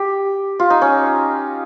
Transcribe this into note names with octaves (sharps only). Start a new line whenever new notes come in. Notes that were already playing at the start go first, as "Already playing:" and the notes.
Already playing: G4
F4
D#4
C#4